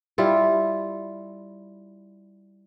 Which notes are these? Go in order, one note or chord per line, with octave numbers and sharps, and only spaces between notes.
G3 E4 F4